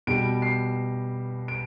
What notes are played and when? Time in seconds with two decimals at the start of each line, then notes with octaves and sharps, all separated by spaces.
0.07 B2 G3 D7
0.42 C7
1.48 D7